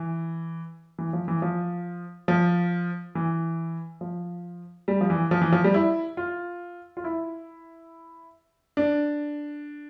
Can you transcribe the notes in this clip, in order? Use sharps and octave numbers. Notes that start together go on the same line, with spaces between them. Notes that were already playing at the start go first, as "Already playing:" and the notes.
Already playing: E3
E3
F3
E3
F3
F3
E3
F3
G3
F3
E3
F3
E3
F3
G3
E4
F4
F4
E4
D4